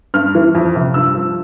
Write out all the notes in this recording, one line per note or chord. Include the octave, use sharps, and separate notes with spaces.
G2 F6
E3
F2
C3 F3
G2 E6
F3